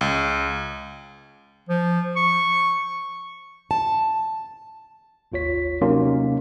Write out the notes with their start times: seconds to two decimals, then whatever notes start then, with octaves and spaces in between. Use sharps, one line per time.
0.01 C#2
1.69 F3
2.16 C#6
3.71 A5
5.32 G#1 D#2 F4 C#5 B6
5.81 C3 F#3 A#3 C#4 D#4 C6